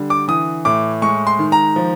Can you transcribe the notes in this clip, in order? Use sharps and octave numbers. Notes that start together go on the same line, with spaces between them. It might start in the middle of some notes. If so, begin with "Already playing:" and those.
Already playing: D3 G3
D6
E3 D#6
A2 D6
G#3 C#6
C6
D#3
A#5
F3